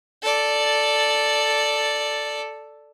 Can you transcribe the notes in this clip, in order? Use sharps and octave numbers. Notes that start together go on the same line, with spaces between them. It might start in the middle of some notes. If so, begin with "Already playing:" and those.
A4 D5